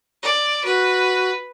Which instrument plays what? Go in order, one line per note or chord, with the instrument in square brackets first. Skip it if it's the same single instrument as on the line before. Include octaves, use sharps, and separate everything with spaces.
[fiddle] D5
[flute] F#4 [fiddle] B4